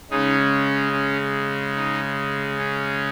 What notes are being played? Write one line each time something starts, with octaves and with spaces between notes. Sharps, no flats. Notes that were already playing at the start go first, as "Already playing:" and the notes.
C#3 G#3 C#4 D#4
C#4
D#4
C#4